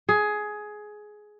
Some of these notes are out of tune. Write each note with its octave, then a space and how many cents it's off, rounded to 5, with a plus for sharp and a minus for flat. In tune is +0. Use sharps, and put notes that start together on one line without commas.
G#4 +15